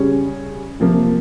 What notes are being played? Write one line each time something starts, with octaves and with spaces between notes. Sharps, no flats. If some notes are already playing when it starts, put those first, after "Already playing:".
Already playing: C#3 G3 C#4 G#4
C3 F3 A#3